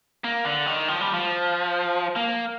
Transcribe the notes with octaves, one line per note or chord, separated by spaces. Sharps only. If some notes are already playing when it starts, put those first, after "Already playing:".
A#3
D3
D#3
F3
G3
F3
A#3